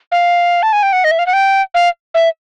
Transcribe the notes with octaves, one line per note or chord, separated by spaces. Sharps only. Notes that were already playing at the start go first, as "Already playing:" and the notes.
F5
A5
G#5
G5
F#5
D#5
E5
F5
F#5
G5
F5
E5